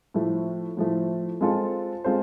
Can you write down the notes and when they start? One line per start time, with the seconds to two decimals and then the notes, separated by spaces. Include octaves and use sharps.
0.14 A2 F3 A3
0.77 A2 F3 A3
1.41 G#3 C4 F4 A4 C5
2.04 G#3 C4 F4 A4 C5